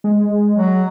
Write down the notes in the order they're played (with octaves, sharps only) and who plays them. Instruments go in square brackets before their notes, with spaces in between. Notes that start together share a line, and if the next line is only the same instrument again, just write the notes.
[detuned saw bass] G#3
[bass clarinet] F#3